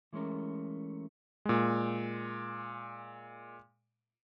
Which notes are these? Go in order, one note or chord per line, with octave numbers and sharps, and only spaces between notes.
E3 G#3 A3 C#4 A#4
A#2 G#3